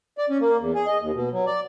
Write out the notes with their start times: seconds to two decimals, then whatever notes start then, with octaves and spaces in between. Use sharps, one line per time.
0.18 D5
0.30 C#4
0.41 A#3
0.59 E2
0.75 G#4
0.86 D#5
1.01 D#2
1.14 B2
1.33 F#3
1.47 D5